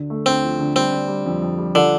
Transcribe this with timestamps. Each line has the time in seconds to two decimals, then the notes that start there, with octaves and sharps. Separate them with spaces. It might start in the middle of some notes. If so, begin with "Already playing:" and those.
Already playing: D2 D3
0.10 A3
0.26 D2 C4
0.43 F3
0.59 D3
0.76 G3 C4
0.92 D3
1.08 G3
1.26 F2
1.42 F2
1.59 G3
1.75 D3 F3